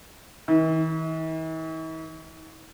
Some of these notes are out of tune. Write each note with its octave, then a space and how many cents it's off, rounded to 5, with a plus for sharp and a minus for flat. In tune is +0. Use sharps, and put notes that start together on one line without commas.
E3 -45